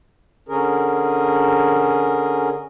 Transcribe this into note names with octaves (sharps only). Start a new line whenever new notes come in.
D3 C#4 G#4 A#4